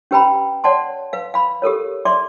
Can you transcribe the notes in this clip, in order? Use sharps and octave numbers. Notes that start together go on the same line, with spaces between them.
C#4 G4 B4 G5 A#5 B5
C#5 D5 F#5 A5 C6
B4 F5
F5 B5
G4 A4 A#4 C#5
D5 E5 C6 D6